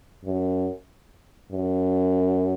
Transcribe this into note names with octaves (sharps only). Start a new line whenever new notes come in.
F#2
F#2